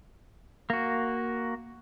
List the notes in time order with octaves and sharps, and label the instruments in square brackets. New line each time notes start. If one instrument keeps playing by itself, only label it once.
[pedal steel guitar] A#3 F#4